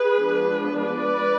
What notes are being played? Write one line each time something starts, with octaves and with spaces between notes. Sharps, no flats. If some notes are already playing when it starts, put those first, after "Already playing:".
Already playing: G#4 B4
F3 G#3 B3 D4
B4 D5